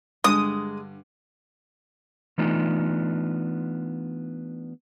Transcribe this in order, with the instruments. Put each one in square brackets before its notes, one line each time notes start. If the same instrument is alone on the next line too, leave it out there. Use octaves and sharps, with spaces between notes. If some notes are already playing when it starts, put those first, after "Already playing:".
[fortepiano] G2 D3 [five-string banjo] G#3 [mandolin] D#6
[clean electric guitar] E3 A3 B3 D4 D#4 F4